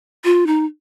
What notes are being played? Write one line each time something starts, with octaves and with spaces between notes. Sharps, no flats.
F4
D#4